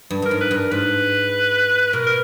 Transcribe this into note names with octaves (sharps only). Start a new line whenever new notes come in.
G2
G2 A#4
G#2
B4
G2
A#4
G#2 B4
B2 A#4
A#4